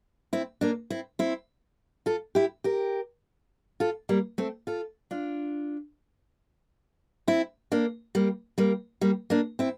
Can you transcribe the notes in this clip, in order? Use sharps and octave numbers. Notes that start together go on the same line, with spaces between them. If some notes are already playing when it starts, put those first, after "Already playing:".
C4 E4
A#3 D4
C4 E4
C4 E4
F4 A4
E4 G4
G4 A#4
F4 A4
G3 A#3
A3 C4
F4 A4
D4 F4
C4 E4
A#3 D4
G3 A#3
G3 A#3
G3 A#3
A#3 D4
C4 E4